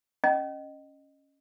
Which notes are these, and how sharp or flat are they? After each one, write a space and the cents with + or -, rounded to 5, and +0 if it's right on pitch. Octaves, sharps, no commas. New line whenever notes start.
C#4 +0 D#5 -10